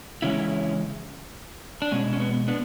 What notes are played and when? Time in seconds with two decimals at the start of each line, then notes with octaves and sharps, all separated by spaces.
0.22 C#3 E3 G#3 C#4 E4
1.82 D4
1.91 B2 G#3 C#4
2.13 C#4
2.20 B3
2.48 B3 D4